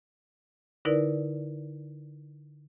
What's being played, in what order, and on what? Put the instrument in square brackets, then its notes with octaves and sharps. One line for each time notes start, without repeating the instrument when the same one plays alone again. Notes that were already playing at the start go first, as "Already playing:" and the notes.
[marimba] D3 D#4 E4 A#4 B4 D5